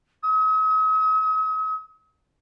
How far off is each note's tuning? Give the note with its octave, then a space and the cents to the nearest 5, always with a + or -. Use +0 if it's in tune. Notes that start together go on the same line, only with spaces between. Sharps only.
D#6 +45